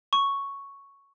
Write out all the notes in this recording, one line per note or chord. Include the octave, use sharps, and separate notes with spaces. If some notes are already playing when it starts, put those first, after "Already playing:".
C#6